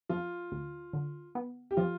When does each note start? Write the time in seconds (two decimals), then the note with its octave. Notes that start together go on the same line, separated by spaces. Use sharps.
0.09 F3 F4
0.52 D2
0.93 D3
1.35 B3
1.71 G4
1.77 F3 F4